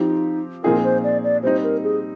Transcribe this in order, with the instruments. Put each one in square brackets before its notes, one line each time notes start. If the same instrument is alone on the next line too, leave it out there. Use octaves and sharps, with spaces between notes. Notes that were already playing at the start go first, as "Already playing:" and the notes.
Already playing: [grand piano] F3 C4 G4 [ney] D#4
[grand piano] A#2 F3 C4 D#4 G#4 [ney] A#4
[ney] C5
D5
D5
[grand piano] G3 C4 D#4 [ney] C5
[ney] A#4
G#4